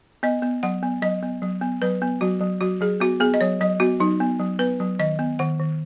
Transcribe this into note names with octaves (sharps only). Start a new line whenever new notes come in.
B3 D#5
B3
F#3 F#5
B3
F#3 D#5
B3
F#3
B3
F#3 B4
B3
F#3 F#4
F#3
F#3 F#4
F#3 G#4
B3 F#4
B3 G#4
D#5
F#3 C#5
F#3 D#5
B3 F#4
F#3 D#4
B3
F#3
B3 B4
F#3
D#3 D#5
B3
D#3 F#5
D#3